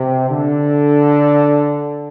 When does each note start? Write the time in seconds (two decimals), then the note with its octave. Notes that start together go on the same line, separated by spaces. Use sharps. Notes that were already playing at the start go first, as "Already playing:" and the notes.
Already playing: C3
0.30 D3